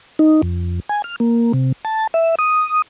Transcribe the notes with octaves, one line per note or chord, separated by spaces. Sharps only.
D#4
F2
G#5
F6
A#3
C3
A5
E5
D#6